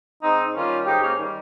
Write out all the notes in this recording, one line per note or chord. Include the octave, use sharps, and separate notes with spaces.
G#2 C4 D#4
D#3 G3 C#4 F4
G#2 D#4 G4
A#3 C#4
D#3 G3